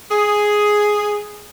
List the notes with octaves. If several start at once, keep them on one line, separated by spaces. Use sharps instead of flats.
G#4